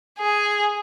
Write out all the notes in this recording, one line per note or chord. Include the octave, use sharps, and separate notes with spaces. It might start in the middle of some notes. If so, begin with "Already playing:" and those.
G#4